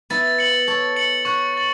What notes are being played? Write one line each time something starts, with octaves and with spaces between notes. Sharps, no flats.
B3 E4 A6
C#7 F#7
A4 C#5 A6
C#7 F#7
C#5 F#5 C#6
A6 F#7